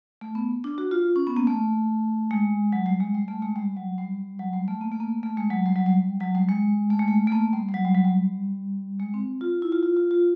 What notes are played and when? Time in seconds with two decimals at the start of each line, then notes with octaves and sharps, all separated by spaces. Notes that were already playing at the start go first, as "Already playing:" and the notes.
0.21 A3
0.35 B3
0.64 D4
0.78 F#4
0.91 F4
1.16 C#4
1.27 B3
1.37 A#3
1.47 A3
2.31 G#3
2.73 F#3
2.86 G3
3.00 G#3
3.14 G3
3.28 A3
3.42 G#3
3.56 G3
3.77 F#3
3.98 G3
4.39 F#3
4.53 G3
4.68 A3
4.81 A#3
4.92 A3
5.00 A#3
5.23 A3
5.37 G#3
5.51 F#3
5.66 G3
5.76 F#3
5.86 G3
6.20 F#3
6.35 G3
6.49 G#3
6.90 A3
6.99 G#3
7.08 A3
7.27 A3
7.32 A#3
7.53 G3
7.69 G3
7.74 F#3
7.85 G3
7.95 F#3
8.05 G3
9.00 G#3
9.14 C4
9.41 F4
9.62 E4
9.72 F4
9.83 F4
9.97 F4
10.11 F4